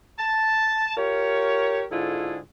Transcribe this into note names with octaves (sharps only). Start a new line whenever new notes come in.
A5
F4 G4 A#4 C#5
G#2 D3 E4 F4 G#4 A4